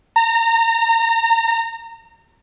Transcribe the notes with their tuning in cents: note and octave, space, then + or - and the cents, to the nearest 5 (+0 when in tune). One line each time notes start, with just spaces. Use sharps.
A#5 -30